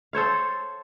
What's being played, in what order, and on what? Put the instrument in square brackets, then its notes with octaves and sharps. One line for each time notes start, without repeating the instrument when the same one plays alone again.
[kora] A4 C5 C#5 F5